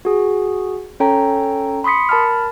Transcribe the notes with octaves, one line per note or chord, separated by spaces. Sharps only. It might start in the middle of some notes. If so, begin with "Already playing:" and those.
F#4 G#4
C#4 A4 C#5 G5 A#5
B5 C6 D#6 B6 C#7
A#4 A5 B5 F6